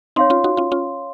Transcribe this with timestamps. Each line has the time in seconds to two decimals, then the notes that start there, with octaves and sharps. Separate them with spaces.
0.16 C4 D#4 C#5 F5 C6
0.30 C#4 F4
0.44 D#4 F#4
0.57 C#4 F4
0.72 C#4 F4